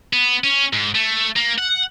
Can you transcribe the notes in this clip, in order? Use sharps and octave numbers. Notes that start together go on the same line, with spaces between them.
B3
C#4
G#2
A3
A#3
F#5